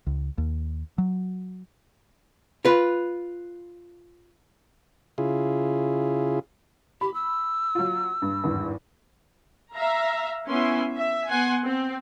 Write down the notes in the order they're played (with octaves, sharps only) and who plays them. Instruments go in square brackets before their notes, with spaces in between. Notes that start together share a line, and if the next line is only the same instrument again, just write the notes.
[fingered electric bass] C#2
D#2
F#3
[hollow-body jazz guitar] F4 B4
[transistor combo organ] C#3 E4 F4 G#4
[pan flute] G4 [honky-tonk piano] B5
[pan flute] E6
[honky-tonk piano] F#3 F4
G2
G#1 E2 G2
[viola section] E5 F5 A#5
B3 C#4 E4 G#5 C6
E5
B3 F#5 G#5 C6
C4